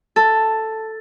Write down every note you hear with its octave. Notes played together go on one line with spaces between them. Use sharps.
A4